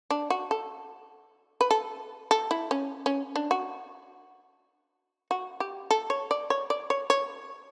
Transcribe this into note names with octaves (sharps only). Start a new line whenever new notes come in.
D4
F#4
A4
B4
A4
A4
E4
C#4
C#4
D4
F#4
F#4
G4
A4
C#5
D5
C#5
D5
C#5
C#5